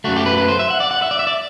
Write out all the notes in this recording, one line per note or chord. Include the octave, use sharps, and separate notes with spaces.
F#2 F#3 A3 F#4
G4
B4
B4
C5
E5
F#5
D5
F#5
E5
D5
E5
D5